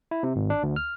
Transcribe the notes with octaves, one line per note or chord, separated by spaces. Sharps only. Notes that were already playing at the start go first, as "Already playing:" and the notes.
E4
C3
G#1
D4
D2
F6